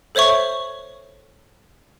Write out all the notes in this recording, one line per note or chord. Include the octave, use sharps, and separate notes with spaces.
A4 C5 C#5 E5 C#6